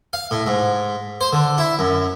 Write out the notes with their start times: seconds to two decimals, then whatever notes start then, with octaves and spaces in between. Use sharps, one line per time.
0.13 F5
0.31 A2
0.47 G#2
1.21 C5
1.33 D3
1.58 E4
1.79 F#2